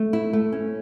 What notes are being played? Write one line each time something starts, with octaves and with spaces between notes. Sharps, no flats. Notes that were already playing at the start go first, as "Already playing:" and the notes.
Already playing: A3
E4
A3
C#4